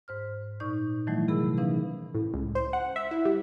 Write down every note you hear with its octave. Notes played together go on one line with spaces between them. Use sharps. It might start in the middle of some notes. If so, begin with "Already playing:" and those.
G#2 C5 F6
A#2 D#4 D5 C#6 G6
D#3 E3 F#3 G3 A3 E4
C3 G#4 A#4 B5 E6
E3 C#4 D#4 B4 F5
A2
C#2
C5
F#5
E5
E4
G3